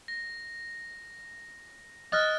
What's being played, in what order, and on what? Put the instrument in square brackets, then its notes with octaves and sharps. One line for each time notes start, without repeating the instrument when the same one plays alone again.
[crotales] A#6
[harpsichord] D#5 [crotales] F6 F#6 A6